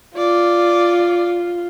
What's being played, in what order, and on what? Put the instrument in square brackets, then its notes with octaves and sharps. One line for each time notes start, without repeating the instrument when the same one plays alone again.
[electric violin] F4 [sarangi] D5